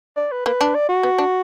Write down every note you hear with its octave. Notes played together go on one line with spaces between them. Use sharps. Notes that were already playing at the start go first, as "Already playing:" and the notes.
D5
B4
A#3 B4
D4
D5
F#4
B3
D4